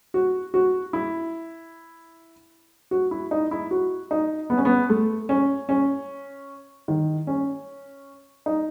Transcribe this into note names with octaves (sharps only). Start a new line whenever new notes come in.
F#4
F#4
E4
F#4
E4
D#4
E4
F#4
D#4
B3
C#4
B3
A3
C#4
C#4
D#3
C#4
D#4